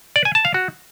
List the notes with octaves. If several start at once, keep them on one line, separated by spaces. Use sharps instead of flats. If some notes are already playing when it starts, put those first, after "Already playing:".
D5
G#5
A5
F5
F#4